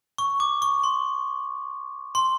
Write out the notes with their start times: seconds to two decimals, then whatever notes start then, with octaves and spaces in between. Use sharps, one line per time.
0.18 C#6
0.40 D6
0.62 C#6
0.84 C6
2.15 C6